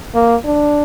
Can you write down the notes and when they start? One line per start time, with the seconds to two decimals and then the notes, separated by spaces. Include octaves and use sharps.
0.15 A#3
0.45 D4